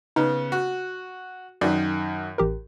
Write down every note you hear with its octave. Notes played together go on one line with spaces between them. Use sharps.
C#3 B3 D#4
F#4
F#2 D#3 D5
A1 G4 A#4